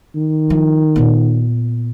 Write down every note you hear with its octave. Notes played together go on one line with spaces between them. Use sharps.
D#3
F3
A#2 B3